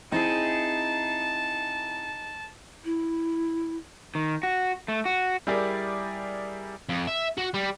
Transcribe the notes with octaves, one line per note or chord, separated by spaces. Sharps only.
C4 D#4 E4 G#4 A5
E4
D#3
F#4
A3
F#4
G3 E4 G4 G#4 A#4 D5
F2
E5
F#4
G3